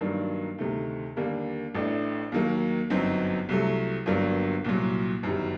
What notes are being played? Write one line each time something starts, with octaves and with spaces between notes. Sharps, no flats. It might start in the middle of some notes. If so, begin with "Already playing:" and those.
G2 D#3 F#3 A#3 D4
D2 C3 D#3 A3
D#2 D3 G3 A#3 D4
A1 A2 A3 D4
D#2 D#3 F#3 A#3
G1 F#2 F#3 C4 D#4
C2 C3 F#3 A3
G1 G2 F#3 A#3 D4
C2 A#2 F#3
G1 F#2 D#3 G3